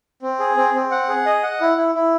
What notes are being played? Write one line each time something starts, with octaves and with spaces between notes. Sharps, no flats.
C4
G#4
C4
C4
F#5
G#4
D#5
F#5
E4
E4
E4